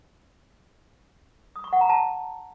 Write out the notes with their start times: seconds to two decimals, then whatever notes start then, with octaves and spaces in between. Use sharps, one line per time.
1.56 D#6
1.64 C#6
1.73 F#5
1.81 A#5
1.90 A5